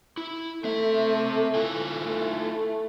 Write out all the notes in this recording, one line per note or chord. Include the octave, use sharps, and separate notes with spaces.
E4
A3 C4 E5
E4 F4 G#5
A3